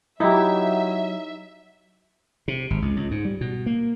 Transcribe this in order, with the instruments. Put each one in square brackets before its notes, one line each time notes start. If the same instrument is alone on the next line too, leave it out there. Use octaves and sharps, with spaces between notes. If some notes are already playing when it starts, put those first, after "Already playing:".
[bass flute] F#3 [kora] D#4 [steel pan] E4 G4 [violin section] E5
[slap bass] C3
G#1
C#2
C#2
G#2
G3
B2
A#3